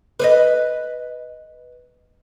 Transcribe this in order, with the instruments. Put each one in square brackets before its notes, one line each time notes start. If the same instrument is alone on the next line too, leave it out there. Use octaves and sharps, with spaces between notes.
[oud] B4 C5 D#5